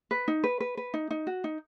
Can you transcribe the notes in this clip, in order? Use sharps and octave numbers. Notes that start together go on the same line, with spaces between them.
B4
D#4
B4
B4
B4
D#4
D#4
F#4
D#4